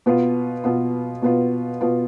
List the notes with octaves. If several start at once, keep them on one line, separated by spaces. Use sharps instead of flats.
B2 B3 F4
B2 B3 F4
B2 B3 F4
B2 B3 F4